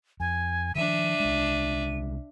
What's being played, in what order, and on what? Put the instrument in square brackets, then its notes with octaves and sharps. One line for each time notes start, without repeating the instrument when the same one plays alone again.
[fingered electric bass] F2 [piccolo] G#5
[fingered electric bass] D#3 F3 [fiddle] D4 E5 [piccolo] D#7
[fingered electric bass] C2 G#3